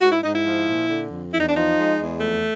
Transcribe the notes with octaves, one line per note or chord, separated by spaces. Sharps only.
G#2 F#4
E4
G#2 D#4
E4
F3
A#2
D3
F2
E2 E4
D#4
D4
F3 D#4
G#3
E2
F2 A3